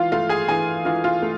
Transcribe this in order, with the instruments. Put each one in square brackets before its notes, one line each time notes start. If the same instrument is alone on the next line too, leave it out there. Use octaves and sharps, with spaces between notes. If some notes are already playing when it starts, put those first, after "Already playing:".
Already playing: [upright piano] E3 F4 F5
A3 F4 F5
G#4 G#5
E3 G#4 G#5
E3 F4 F5
F4 F5
A3